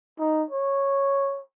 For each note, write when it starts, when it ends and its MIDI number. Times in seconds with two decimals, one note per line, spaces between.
0.19 0.43 63
0.51 1.41 73